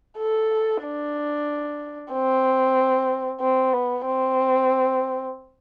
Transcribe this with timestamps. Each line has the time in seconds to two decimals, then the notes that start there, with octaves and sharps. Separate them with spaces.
0.18 A4
0.83 D4
2.12 C4
3.41 C4
3.73 B3
4.06 C4